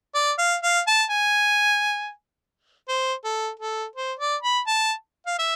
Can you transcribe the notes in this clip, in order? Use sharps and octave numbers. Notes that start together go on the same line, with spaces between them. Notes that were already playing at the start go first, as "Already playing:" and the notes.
D5
F5
F5
A5
G#5
C5
A4
A4
C5
D5
B5
A5
F5
E5